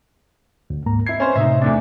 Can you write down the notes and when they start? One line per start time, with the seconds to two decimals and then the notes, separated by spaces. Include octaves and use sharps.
0.70 D2
0.86 G#2 A#3 A#5
1.06 E4 G#6 C7
1.20 C#4 B4 C5
1.36 A2 C3 D#4 E5
1.61 E2 A3 D4